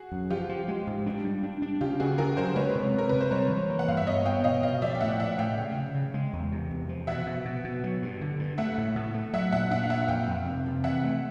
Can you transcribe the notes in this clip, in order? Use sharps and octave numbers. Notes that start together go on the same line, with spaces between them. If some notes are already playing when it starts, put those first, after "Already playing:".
Already playing: F#4 G#4
F#2
F3 F4 G4
F3
G#3
G#2
D4
G3
D4
D4
C#3 F4 G4
C#3 F#4 G#4
C#3 G#4 A#4
F#3 A#4 C5
G#3 B4 C#5
C3
C3 A#4
C3 B4
C5
G3 B4 C#5
E3
A#3
F#5
G2 F5
E5
B3 C#5 D#5
B3 F5 G5
B2 D#5 F5
B2 D#5 F5
F3 D5 E5
G5
A2 E5 F#5
F3 E5 F#5
A2 F5 G5
C#3
C#3
C#3
G#3
E2
C3
E2
F3
B2 E5 F#5
B2
B2
B2
F#3
G2
D3
G2
A3 E5 F#5
A2
A2
A3
F#3 E5 F#5
A#2 E5 F#5
D4 E5 F#5
F5
A#2 E5 F#5
F2 F5 G5
F2
C3
C3
E3 E5 F#5
A3